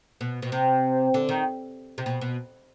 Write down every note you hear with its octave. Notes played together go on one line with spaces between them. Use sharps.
B2
B2
C3
D3
D#3
C3
B2
B2